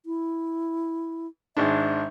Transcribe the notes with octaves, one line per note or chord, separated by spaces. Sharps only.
E4
G#1 G#3 D4 E5